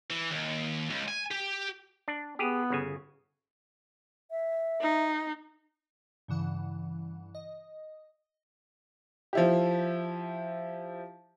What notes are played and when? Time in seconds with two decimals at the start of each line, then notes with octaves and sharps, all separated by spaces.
0.10 E3
0.31 D#2
0.90 C#2
1.08 G#5
1.31 G4
2.08 D4
2.39 B3 G4 G#4
2.70 G1 C#3 G#5
4.31 E5
4.81 D#4
6.28 G2 C#3 E3 F#5
7.35 D#5
9.33 F3 E4 G4